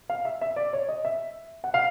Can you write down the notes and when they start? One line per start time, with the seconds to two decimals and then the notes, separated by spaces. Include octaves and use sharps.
0.10 F5
0.25 E5
0.41 E5
0.56 D5
0.73 C#5
0.88 D#5
1.05 E5
1.64 F#5
1.74 F5